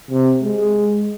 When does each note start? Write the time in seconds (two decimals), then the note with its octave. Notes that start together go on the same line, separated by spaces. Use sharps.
0.11 C3
0.42 G#3